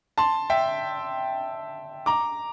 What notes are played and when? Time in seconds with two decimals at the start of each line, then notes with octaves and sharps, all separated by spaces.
0.18 A5 C6
0.50 E5 G5
2.06 A#5 D6